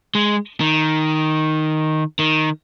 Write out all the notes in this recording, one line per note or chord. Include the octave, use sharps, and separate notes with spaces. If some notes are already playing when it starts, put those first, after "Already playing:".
G#3
D#3
D#3